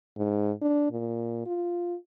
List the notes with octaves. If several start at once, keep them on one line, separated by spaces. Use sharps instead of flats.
G#2
D4
A#2
F4